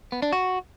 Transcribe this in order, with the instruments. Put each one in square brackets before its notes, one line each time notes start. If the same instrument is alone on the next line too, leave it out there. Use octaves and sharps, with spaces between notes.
[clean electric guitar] B3
D4
F#4